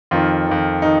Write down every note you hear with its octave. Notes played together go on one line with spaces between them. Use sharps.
F2 D#3 F4
F2 D#3
D#3 D#4